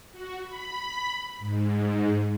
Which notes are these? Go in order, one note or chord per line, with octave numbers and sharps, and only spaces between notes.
F#4
B5
G#2